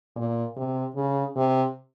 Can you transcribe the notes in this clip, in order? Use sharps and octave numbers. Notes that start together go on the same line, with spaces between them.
A#2
C3
C#3
C3